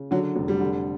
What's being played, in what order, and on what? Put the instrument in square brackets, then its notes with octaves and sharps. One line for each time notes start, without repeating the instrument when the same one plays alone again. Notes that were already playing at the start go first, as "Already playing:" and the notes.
Already playing: [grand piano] C#3
D3 F#3
F1
G3
D3